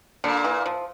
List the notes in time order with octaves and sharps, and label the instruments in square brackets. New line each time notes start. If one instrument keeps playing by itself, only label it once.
[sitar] A#2 A#3 [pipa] D3
[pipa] E3
F3